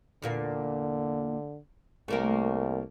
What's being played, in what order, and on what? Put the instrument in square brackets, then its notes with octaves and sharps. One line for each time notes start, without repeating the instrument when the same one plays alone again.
[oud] E2 A#2 A#3 [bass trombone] D3
[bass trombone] C2 [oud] A3 A#3 A#4